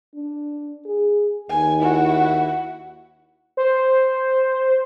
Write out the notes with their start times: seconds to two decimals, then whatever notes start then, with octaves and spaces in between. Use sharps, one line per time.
0.15 D4
0.85 G#4
1.50 D#2 G#5
1.80 E4 F#4
3.57 C5